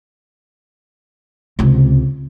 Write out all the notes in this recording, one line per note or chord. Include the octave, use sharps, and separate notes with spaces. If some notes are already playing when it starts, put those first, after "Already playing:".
C#2 C3